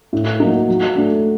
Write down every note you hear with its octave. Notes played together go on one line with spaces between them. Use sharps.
A2
F#3 A#3 D#4
F#3
A3 D4